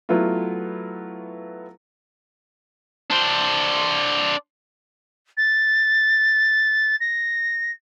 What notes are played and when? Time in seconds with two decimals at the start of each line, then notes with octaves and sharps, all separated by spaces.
0.09 F#3 A3 B3 E4 F4
3.11 D4 C5
5.37 A6
7.00 A#6